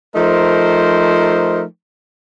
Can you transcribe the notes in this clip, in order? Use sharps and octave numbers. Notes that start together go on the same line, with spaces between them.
F3 A3 D#4 A#4 C5